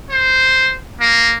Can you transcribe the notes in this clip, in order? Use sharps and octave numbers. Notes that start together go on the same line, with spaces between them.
C5
A#3